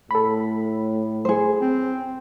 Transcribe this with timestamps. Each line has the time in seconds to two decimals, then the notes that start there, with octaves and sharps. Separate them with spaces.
0.11 A2 A4 B5
1.25 G#4 C5
1.61 C4